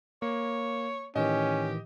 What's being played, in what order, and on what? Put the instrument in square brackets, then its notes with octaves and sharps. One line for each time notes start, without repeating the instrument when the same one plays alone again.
[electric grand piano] A#3 [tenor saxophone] C#5
[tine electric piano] A2 D#3 E3 [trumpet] C#4 [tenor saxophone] G4 [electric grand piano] D#5